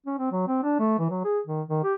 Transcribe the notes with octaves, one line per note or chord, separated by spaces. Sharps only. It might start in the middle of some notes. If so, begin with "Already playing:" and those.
C#4
C4
F#3
C4
D4
A3
E3
F#3
G#4
D#3
D#3
G4